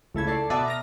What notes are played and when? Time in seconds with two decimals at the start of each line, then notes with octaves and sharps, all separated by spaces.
0.14 C#2 A3 E4 G#6
0.27 A4 D5 C7
0.50 B2 B3 D5 E5 A5 D#6
0.66 A#5 F6 A#6